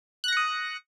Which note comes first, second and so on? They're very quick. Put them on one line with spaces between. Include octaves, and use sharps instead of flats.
F#6 A#6 C#7 D#6